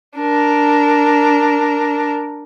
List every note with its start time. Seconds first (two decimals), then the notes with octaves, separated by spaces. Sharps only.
0.18 D4 A#4